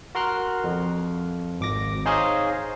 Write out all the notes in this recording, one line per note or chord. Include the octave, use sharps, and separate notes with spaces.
F#4 A#4 C6 F6 F#6
F2
G#1 D6 A#6
D#4 G#4 C5 C#5 D#5 F5